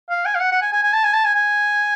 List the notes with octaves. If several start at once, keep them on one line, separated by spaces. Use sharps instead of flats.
F5
G#5
F5
F#5
F#5
G#5
G#5
G#5
A5
G#5
A5
G#5
G#5